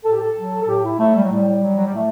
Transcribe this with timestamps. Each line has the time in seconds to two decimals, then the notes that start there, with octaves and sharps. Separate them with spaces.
0.04 A2 A4
0.12 G4
0.20 A4
0.37 F#3
0.62 A4
0.67 A2 G4
0.84 E4
0.99 F#3 A3
1.15 G3
1.23 F#3
1.31 A2 G3
1.63 F#3
1.77 F#3
1.86 G3
1.94 A2 A3